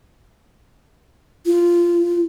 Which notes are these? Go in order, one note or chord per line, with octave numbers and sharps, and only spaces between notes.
F4